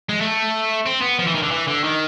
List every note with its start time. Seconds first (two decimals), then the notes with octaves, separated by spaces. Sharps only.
0.09 G#3
0.20 A3
0.86 C4
1.01 B3
1.19 F3
1.27 E3
1.34 D#3
1.42 D3
1.51 E3
1.67 D3
1.84 D#3